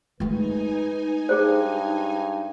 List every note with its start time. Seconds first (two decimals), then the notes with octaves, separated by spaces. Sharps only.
0.20 G#3 A3 D#4 B4 G#5
1.29 G2 G#4 C5